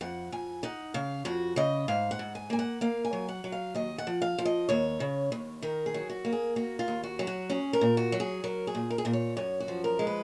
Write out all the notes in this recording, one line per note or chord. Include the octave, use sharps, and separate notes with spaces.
F2 F#5
F2 G#5
D#4 F#5
C#3 F5
F2 F#4
C#3 D#5
G#2 F5
F#5
G#2
G#5
A#3 G#5
F#5
A#3 F5
G#5
F#3
F#5
F#3
F5
D#2 D#5
F#5
F3
F5
F3
D#5
D#2 C#5
C#3
D#2
D#3 A#4
G#4
F#3
F#4
A#3
G#4
A#3 F#4
F4
D#2
F#4
F#3
F#4
C#4 G#4
A#4
A#2
F#4
F#3
G#4
F#3 A#4
G#4
A#2
A#4
G#4
A#2 A#4
C#5
F#2 C#5
F#4
F3
A#4
G#3
B4